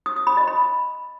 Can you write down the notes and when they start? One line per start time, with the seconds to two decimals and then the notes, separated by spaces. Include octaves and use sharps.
0.06 D#6
0.16 D#6
0.27 B5
0.37 D#5
0.48 B5